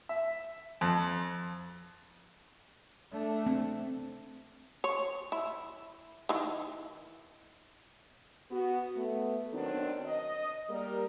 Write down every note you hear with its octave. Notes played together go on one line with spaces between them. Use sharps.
E5
F2
A3 D4
C4
C#5
E4
D#3 E3
B3 F#4
A3 B3
D#3 F#3 B3 C4 D4
D#5
G3 A#3 A#4